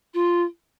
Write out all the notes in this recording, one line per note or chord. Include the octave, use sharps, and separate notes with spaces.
F4